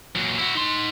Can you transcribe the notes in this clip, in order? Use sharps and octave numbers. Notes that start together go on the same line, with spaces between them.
A#2 F#3
E4 F#4
D#4 C6